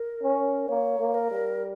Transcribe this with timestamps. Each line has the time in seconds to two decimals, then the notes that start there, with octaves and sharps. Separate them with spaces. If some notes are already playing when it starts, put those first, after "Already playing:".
Already playing: A#4
0.23 C#4
0.68 A#3 C#5
0.99 A#3
1.14 A#4
1.31 G3